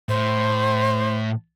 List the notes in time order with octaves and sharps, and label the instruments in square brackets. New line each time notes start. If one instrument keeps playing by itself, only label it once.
[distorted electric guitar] A2 [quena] C5